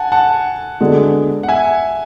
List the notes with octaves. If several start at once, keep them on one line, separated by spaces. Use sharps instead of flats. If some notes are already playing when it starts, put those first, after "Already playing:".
Already playing: F#5 G#5 A5
F#5 A5
D3 G#3 B3 F#4 A4
F#5
E5 G#5